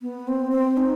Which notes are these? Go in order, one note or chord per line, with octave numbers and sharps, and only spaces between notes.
B3
C4
C4
D#4